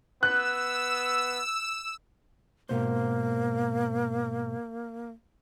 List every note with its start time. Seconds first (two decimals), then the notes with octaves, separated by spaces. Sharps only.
0.23 B3 E6 F#6
2.69 G#2 B2 A#3 C5